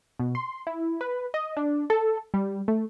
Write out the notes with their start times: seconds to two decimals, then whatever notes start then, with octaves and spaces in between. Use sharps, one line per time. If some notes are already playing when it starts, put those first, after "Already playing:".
0.19 B2
0.35 C6
0.67 E4
1.01 B4
1.34 D#5
1.57 D4
1.90 A4
2.34 G3
2.68 A3